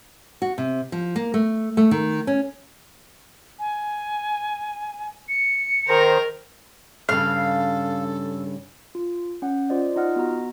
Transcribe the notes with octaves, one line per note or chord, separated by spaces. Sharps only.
F#4
C3
F3
A#3
A3
A3
D#3
C#4
G#5
C#7
D#3 A#4 C5 A#6
G2 C#3 A4 F5
F4
C#4 F#5
F4 C5 D5 D#5
D#4 F4 D#5 F#5 F6
B3 F#4 A#5